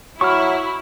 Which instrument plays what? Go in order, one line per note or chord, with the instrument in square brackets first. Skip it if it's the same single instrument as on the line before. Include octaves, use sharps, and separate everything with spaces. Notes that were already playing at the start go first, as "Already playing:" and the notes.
[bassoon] F#3 [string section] E4 [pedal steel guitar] C#6 F6